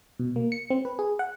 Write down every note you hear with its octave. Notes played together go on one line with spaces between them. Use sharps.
B2
A#3
C#7
C4
B4
G#4
F#5